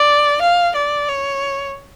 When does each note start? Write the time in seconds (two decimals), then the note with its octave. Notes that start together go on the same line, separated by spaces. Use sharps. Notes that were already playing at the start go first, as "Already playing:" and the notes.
Already playing: D5
0.42 F5
0.75 D5
1.08 C#5